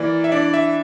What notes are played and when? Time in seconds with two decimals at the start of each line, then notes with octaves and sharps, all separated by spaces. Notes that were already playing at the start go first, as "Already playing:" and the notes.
Already playing: E3 A#3 D5
0.24 E5
0.32 D4 D5
0.54 E5